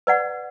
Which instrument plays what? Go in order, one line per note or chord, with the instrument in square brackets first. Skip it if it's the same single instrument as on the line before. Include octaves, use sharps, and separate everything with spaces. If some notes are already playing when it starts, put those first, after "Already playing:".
[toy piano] B4 D5 F#5